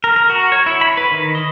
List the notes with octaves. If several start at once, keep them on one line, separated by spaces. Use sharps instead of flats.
A#4
A#4
F#4
C#5
E4
B5
B4
D#3
D#5